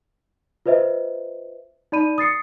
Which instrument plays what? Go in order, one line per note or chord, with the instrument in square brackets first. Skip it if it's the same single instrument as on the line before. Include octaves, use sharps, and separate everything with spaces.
[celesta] F4 B4 C5 D#5 E5
D#4 D5 B5 D#7
D#6 A6 C7 C#7